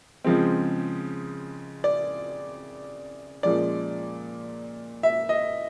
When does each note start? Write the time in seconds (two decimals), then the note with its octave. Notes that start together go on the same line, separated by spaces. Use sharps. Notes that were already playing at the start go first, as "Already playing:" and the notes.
0.24 C#3 F3 G#3 C4
1.84 D5
3.43 A#2 F3 G#3 C#4 D5
5.03 E5
5.29 D#5